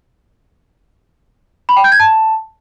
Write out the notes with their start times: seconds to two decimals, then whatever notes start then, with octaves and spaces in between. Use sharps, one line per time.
1.69 B5
1.76 G5
1.84 G6
1.92 G#6
2.00 A5